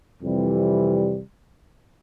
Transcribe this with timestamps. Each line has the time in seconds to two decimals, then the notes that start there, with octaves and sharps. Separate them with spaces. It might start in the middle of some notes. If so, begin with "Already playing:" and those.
0.23 F2 C3 E3 G3